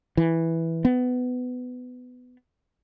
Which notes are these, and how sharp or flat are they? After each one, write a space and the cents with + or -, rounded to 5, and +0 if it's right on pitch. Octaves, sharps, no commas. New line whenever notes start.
E3 -5
B3 +20